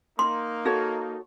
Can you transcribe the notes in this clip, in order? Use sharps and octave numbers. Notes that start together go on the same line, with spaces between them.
A#3 D#4 C6
F#4 A4 C#5